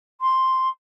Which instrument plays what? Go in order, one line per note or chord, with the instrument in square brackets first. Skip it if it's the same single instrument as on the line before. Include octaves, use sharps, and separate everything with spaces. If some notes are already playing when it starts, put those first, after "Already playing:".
[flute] C6